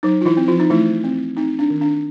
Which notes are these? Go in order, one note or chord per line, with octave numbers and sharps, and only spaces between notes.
F#3 D#4
F4
E3 E4
C4
F3 F4
D#4
E3 A3 E4
C4
C4 D#4
D4
D#3
D4